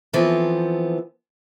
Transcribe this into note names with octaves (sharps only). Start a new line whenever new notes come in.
E3 F3 B3 C4 A4